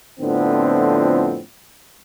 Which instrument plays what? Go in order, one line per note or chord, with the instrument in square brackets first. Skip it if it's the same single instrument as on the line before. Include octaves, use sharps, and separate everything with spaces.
[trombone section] F2 A2 D3 F3 B3 C4